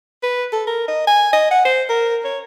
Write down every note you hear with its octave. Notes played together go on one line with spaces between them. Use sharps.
B4
A4
A#4
D#5
G#5
D#5
F#5
C5
A#4
C#5